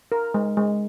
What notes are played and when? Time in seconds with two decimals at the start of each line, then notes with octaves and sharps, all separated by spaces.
0.12 A#4
0.34 G#3
0.57 G#3